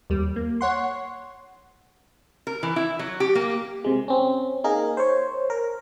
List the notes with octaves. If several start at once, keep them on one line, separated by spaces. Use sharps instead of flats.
D#2 G3
A#3
C#5 F#5 C6
A#4
E3
E4
F#3
G4
A#3
C3 G#3
C4 C#4
A#3 D#4 G#4 A#4
C5 C#5
A#4